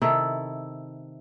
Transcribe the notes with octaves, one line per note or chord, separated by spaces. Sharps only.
C3 D#3 E4 A4